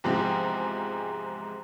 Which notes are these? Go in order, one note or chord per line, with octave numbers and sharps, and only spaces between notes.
E2 G#2 C3 F3 G#3 C4